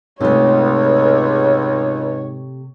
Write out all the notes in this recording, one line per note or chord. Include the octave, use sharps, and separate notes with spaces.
C#2 G#2 C3 A3 C#5